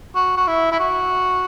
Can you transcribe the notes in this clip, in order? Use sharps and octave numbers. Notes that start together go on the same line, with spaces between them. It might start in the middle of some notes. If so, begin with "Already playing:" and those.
F#4
F#4
E4
E4
F#4